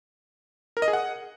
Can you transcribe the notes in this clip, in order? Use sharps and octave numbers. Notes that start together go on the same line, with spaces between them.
A#4
D#5
G#4
F#5